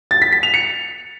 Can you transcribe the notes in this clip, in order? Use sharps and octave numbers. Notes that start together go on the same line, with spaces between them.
A6
B6
B6
F7
C#7